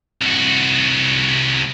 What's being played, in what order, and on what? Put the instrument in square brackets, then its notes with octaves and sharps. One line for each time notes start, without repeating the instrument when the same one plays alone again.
[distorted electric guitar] C2 F#4